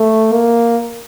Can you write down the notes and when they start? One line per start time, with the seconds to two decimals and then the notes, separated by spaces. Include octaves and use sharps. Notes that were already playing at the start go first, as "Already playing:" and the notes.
Already playing: A3
0.33 A#3